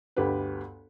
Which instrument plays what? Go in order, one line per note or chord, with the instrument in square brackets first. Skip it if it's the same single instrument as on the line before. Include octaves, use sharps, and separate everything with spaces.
[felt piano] G1 D2 G4 B4